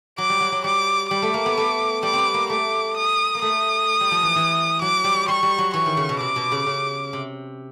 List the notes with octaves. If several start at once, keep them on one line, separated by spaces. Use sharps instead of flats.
F#3 D6
G3
F#3
F#3
G3 D6
G3 D6
A3
A#3
B3
A3
G3 D6
B3 C4
A#3
A3 D6
D#6
A#3
A3 D#6
G3
F3
E3
E3
F#3 D6
G3
G3 C#6
G3
F#3
E3 C#6
D#3
C#3
B2
C3 D6
B2
C#3
C#3
C3